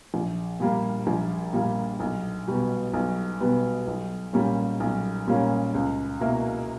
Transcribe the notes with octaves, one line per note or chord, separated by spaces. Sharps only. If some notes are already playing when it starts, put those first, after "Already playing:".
A#1
A#2 G3 A#3
A#1
A#2 G3 A#3
B1
B2 G3 B3
B1
B2 G3 B3
B1
A#2 G3 A#3 C#4
B1
A#2 G3 A#3 C#4
C#2
B2 A#3 E4 A#4